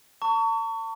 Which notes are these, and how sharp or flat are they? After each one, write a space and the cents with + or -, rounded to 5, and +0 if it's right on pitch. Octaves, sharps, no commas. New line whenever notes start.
A5 +40 C#6 +25